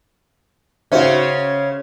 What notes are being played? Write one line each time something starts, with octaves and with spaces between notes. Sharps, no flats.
C#3 C#4 F#4 C5 E5